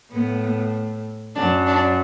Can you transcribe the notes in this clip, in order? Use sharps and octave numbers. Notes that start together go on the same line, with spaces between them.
A2 B3
F#2 D4
D4